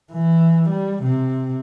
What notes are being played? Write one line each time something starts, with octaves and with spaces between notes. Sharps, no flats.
E3
G3
C3